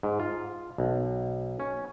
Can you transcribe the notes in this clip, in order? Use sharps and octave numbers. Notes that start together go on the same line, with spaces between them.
G#2
F4
B1
C#4